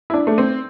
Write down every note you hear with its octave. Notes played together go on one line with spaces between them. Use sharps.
E4
D4
A3
C4